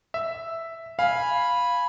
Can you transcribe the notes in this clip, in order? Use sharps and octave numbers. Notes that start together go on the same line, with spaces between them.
E5
F5 G#5 B5